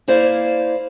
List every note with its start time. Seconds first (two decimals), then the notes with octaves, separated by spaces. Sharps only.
0.08 A#3 E4 C5 D5 F5